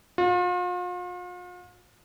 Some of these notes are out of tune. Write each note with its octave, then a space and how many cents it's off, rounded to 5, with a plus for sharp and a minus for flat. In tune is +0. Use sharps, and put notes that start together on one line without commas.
F4 +40